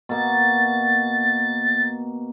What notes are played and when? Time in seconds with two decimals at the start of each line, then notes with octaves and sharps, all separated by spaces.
0.09 B2 A#3 A6